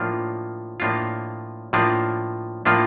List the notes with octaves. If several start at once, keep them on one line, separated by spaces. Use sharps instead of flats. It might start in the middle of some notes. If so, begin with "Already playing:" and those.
Already playing: A2 F3 A#3 D4 F4
A2 F3 A#3 D4 F4
A2 F3 A#3 D4 F4
A2 F3 A#3 D4 F4